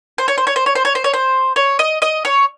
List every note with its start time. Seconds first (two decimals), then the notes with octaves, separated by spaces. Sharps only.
0.18 C5
0.28 C#5
0.38 C5
0.47 C#5
0.56 C5
0.66 C#5
0.75 C5
0.85 C#5
0.95 C5
1.04 C#5
1.14 C5
1.56 C#5
1.79 D#5
2.02 D#5
2.25 C#5